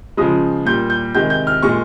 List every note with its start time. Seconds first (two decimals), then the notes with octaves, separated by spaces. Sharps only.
0.17 C#3 F3 G#3 D#6
0.66 A#2 G3 G6
0.90 G6
1.14 C3 D#3 G#3 G6
1.30 G6
1.47 F6
1.63 A#2 G#3 C#6